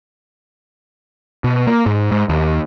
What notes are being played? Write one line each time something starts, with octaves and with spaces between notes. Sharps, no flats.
B2
A#3
G#2
G#2
D#2